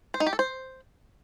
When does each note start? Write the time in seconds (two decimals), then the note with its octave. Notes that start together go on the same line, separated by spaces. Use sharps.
0.14 C5
0.20 D#4
0.27 G4
0.33 A4
0.39 C5